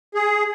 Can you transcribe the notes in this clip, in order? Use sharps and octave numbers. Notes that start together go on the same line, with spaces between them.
G#4